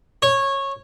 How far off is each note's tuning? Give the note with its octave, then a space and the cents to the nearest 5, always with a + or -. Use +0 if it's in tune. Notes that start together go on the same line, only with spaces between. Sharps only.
C#5 -15